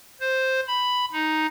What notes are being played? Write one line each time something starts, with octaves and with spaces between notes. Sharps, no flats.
C5
B5
D#4